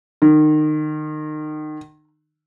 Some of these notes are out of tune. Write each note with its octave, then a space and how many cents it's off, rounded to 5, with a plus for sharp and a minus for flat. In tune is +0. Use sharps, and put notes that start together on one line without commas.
D#3 -30